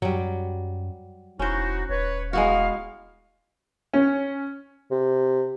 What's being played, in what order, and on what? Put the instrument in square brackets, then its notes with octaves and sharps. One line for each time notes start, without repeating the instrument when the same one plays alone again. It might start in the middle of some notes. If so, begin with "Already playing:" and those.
[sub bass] F#2 [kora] F#3 G3
[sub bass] E1 [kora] C#4 C5 [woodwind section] D#4 E4 F#4
[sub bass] D#1 [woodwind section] B4 C#5
[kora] G#3 B3 F#4 [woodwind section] E4 F5
[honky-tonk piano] C#4
[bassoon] C3